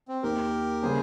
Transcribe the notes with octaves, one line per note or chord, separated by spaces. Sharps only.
C4
D#2 D#3 A#3 G4 A#4
C#3 G3 A#3 C#4 G#4 C5